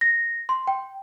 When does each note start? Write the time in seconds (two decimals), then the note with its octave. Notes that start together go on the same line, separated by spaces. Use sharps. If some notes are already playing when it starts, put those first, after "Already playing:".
0.01 A#6
0.49 C6
0.67 G5